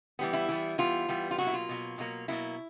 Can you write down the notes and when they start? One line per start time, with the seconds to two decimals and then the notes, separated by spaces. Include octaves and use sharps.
0.19 E3 G3 B3
0.33 E4
0.49 E3 G3 B3
0.78 E3 G3 B3 F4
1.08 E3 G3 B3
1.31 F4
1.38 B2 F#3 A#3 F#4
1.47 E4
1.53 F4
1.69 B2 F#3 A#3
1.98 B2 F#3 A#3
2.28 B2 F#3 A#3 E4